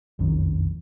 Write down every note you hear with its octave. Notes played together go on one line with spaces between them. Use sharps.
F#1 B1 F2 D#3